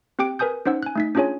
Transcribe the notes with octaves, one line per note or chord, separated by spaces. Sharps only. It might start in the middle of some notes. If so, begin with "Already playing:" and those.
C4 G4 G5 D6 D7
A#4 B4 G#5 D#6 G6
C#4 D#4 C5 F#5 E6
G#5 F#6
A3 D#4 B6
C#4 D4 F4 G#4 C#5 G#5